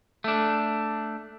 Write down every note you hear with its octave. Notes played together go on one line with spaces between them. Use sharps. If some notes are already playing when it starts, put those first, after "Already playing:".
A3 D4